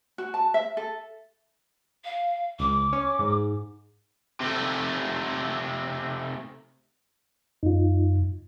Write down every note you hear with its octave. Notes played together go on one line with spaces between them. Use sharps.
F#4
A5
E5
A4
F5
C#2 D6
C#4
G#2
C3 A3
F#2 D#4 F4